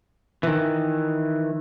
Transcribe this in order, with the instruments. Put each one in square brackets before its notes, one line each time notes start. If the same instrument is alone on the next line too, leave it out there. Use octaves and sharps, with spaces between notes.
[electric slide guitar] D#3 E3